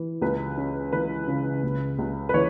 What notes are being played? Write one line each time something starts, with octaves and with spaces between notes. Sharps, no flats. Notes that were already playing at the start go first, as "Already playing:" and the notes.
Already playing: E3
C#2 B4
C#4
E3 B4
C#3
C#2
C#2
B4
E3 C#5